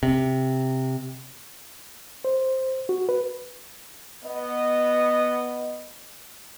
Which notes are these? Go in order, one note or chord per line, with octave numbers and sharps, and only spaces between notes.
C3
C5
F#4
B4
B3 D#5